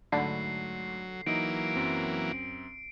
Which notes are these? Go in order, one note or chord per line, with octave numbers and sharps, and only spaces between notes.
G#2 D3 F#3 A3 B5 C7
E3 F#3 A#3 D#4 D#5 D7
F#2 C4